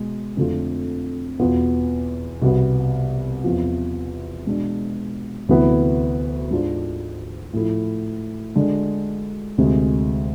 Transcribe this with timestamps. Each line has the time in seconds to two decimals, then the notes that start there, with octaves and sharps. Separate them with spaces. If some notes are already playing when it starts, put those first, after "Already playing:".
Already playing: B2 G#3
0.37 F2 D3 A3 C4 F4
1.39 E2 B2 B3 F4
2.42 C2 B2 B3
3.44 E2 C3 F3
4.46 B2 G#3 D4
5.49 D2 C3 E3 B3 E4
6.51 G#2 G#3 D4 F4
7.53 A2 F3 A3 E4
8.56 D3 G#3 D4
9.58 D2 C3 G#3